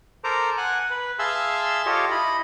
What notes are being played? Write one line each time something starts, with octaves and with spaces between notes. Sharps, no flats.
A4 A#4 C5 A#5 D6
F#5 G#5 F#6
B4
G#4 E5 F5 A5 C6 E6
F4 G4 A4 C#5 D#5 F5
E4 D#5 B5